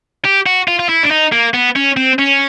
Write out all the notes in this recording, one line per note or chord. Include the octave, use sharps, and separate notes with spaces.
G4
F#4
F4
F4
E4
D4
D#4
A#3
B3
C#4
C4
C#4